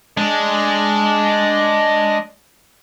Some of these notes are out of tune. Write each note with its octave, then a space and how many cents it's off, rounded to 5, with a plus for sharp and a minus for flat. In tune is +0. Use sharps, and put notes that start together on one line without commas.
G#3 +0 D4 +0